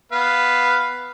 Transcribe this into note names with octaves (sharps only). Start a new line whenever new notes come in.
B3 B4 F5